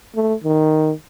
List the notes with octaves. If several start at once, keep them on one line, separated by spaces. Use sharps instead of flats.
A3
D#3